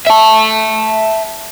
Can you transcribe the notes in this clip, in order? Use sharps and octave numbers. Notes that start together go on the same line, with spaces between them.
E5 A5